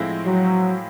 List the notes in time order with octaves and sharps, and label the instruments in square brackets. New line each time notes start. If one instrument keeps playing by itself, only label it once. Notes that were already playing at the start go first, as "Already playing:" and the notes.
Already playing: [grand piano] A2 F3 G#3 C4 E4
[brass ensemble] F#3